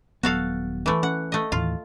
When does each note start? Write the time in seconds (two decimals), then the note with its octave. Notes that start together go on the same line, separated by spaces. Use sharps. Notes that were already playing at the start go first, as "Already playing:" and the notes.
0.23 D#1 F#3 B3 F#4 A4 F5
0.86 E3 A3
1.03 C#4 F#5
1.32 A3 D#5
1.52 D#2 A2 E3 F4